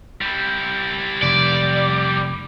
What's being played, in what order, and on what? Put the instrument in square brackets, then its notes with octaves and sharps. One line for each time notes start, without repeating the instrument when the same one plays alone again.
[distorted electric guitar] G3 E4
[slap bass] F1 [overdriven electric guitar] D5